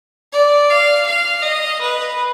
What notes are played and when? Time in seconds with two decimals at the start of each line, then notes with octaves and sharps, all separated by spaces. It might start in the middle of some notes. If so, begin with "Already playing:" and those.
0.32 D5
0.70 F5
1.07 F5
1.43 D#5
1.80 B4